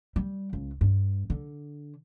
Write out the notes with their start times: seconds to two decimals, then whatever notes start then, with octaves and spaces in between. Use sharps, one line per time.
0.16 G3
0.53 C#2
0.81 G2
1.30 D3